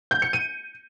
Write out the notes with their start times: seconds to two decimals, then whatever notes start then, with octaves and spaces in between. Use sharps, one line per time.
0.11 G6
0.22 C#7
0.33 D#7